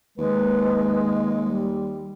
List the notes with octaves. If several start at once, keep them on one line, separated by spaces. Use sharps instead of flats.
D#2 G#3 B4
G3